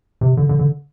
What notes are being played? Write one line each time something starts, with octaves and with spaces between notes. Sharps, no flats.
C3
D3
D3
D3